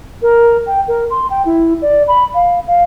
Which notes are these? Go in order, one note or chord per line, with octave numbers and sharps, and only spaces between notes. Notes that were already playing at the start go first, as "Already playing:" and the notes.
A#4
G5
A#4
C6
G5
E4
D5
B5
F5
F5